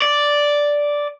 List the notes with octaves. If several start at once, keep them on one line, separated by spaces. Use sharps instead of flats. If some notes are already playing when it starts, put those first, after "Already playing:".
D5